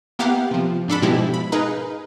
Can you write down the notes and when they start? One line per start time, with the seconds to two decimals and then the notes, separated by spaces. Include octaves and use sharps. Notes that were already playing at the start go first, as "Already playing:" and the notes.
0.19 A#3 B3 E4 G4 F5 F#5
0.51 C3 F3
0.88 G#2 D4 A4 B5
1.02 G#2 B2 F3 G#3 E4 G4
1.34 B5
1.52 D#4 G#4 A#4 B4 D#5 F5